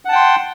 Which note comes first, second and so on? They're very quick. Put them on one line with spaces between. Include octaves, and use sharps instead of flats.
F#5 A5 G5 C6